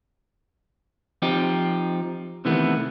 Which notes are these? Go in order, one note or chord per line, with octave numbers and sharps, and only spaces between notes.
F3 C4 D#4 G4
C3 D#3 E3 A3 B3